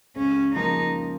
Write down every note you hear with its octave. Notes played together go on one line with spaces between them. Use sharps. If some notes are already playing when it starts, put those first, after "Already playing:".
C#2 C#4
C#3 F3 A#3 D#4